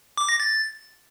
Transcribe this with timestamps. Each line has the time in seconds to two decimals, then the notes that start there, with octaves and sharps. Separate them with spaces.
0.18 D6
0.29 A#6
0.40 A6